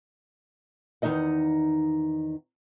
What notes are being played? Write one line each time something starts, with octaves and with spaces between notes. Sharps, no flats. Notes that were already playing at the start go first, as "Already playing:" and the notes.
E2 D#3 C#4 D#4 D#5 F#5